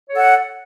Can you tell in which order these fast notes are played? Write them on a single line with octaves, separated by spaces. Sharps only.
C#5 A4 F#5